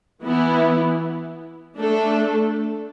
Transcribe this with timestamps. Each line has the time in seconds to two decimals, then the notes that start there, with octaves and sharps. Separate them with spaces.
0.23 E3 B3 E4
1.77 A3 D4 A4